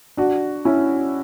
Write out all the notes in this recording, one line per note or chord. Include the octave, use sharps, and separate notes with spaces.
D4 F#4
C#4 E4